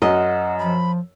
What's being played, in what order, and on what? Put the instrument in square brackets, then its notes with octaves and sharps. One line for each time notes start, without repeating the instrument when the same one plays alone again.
[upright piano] F#2 [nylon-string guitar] D#5 [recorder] F#5
[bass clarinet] F3 [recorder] B5